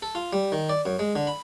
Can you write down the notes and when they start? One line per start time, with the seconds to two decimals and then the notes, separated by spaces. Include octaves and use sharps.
0.02 A4
0.15 F4
0.33 G3
0.52 D#3
0.69 D5
0.86 F#2
0.99 G#3
1.16 D3
1.27 B5